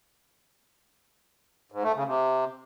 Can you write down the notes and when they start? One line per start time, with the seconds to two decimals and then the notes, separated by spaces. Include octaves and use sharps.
1.72 G#2
1.84 A3
1.95 C#3
2.07 C3